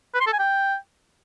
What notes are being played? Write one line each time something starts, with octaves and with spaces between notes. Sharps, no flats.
B4
C6
A4
G#5
G5